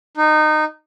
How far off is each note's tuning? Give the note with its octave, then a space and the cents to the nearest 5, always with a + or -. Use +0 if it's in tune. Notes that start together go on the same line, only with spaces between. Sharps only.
D#4 -20